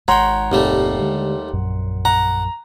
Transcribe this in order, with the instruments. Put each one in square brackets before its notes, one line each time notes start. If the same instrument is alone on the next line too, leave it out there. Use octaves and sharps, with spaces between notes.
[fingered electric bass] G#1 G#2 [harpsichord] C#5 G5 [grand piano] F#5 A#5 C6
[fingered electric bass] F#1 A#2 C4 [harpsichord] D#2 G3 A3
[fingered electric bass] D3 G#3
A#1 F#2
[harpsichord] F#5 [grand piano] A#5